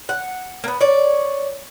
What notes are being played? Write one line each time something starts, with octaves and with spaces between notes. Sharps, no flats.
F#5
A#3 B3
C#5 D5